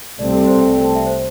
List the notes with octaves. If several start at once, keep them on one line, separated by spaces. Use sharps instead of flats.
C2 C3 A3 C4 D5
A4
C5
G5
G5
A5
E5
C5